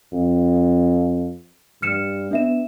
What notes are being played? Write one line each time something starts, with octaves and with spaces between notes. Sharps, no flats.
F2
G2 F6 C#7 E7
B3 D4 E5 E7